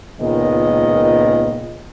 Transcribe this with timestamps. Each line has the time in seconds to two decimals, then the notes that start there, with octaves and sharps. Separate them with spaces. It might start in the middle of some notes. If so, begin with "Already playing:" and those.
0.21 C#2 A#2 D#3 G#3 B3 D#5